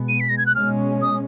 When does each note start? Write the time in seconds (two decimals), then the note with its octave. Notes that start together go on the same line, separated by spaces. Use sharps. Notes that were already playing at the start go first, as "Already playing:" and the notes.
Already playing: B2 G#3 B3
0.09 D#7
0.20 B6
0.29 A#6
0.38 G#6
0.46 F#6
0.55 B2 G#3 C#4 F6
1.02 D#6